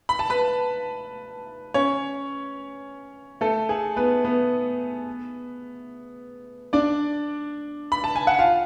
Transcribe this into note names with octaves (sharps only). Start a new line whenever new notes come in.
B5
A5
B4 B5
C#4 C#5
A3 A4
G#4
B3 B4
B3 B4
D4 D5
B5
A5
G#5
F#5
F4 F5